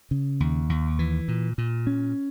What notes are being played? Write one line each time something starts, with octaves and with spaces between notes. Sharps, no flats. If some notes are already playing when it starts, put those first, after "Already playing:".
C#3
D#2
D#2
E3
A#2
A#2
C#4